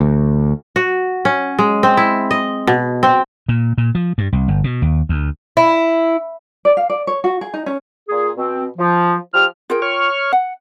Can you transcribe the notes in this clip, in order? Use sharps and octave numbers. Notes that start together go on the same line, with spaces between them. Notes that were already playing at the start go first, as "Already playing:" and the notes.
D2
F#4
C#4
G#3
C4
E4
D#5
B2
C4
A#2
A#2
F3
G2
C2
G1
B2
D#2
D2
E4
D5
F5
D5
C#5
F#4
G#4
D#4
C#4
A#2 G#4
B2 C4
F3
F3 G4 F6
F4 G#4 A#4 G5
C#5 C#6 F6
F#5